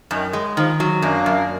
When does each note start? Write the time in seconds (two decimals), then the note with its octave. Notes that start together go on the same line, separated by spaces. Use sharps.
0.11 F#2 D#3
0.33 G#3
0.57 D#3 F3
0.80 F#3
1.02 F#2 A#3 D4
1.26 F#2